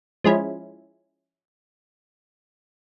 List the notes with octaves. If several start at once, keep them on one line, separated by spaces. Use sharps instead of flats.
F3 G#3 C#4 E4